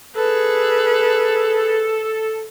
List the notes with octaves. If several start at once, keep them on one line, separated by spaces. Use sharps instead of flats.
G#4 A4 B4